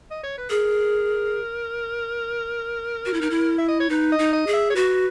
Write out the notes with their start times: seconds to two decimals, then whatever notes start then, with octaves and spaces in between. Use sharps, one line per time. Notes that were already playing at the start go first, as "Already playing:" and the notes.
0.11 D#5
0.23 C#5
0.37 B4
0.49 G#4 A#4
3.05 F#4
3.14 E4
3.21 D#4
3.30 E4
3.58 E5
3.68 D#5
3.80 C#5
3.89 D#4 B4
4.12 D#5
4.19 D#4
4.33 D#5
4.47 G#4
4.53 E5
4.70 C#5
4.75 F#4 B4